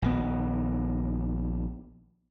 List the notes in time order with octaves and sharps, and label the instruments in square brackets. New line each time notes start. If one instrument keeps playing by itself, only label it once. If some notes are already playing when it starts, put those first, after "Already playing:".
[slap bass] A#1 D#3 B3